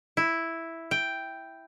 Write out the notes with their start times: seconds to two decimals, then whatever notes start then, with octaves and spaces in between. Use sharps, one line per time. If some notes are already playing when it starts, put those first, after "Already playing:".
0.17 E4
0.91 G5